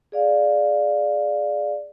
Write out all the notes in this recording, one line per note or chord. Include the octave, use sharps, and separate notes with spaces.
G#4 D5 F5